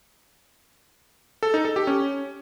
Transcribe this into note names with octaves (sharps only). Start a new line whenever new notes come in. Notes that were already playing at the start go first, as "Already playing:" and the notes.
A4
D#4
A4
G4
C#4